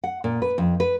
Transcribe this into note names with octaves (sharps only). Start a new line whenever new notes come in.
F#5
A#2
B4
F2
B4